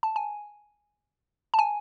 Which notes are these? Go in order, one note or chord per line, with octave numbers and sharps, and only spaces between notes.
A5
G#5
A5
G#5